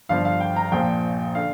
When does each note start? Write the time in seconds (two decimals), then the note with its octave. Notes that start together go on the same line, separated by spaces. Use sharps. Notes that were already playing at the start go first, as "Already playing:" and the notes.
0.09 G1 G2 F3 F5
0.25 F5
0.40 G5
0.56 A#5
0.72 A#1 A#2 F3 G5
1.35 D3 F5